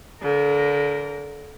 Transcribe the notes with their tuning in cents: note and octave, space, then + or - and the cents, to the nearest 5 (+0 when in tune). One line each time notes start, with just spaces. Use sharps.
D3 -35 A#4 +0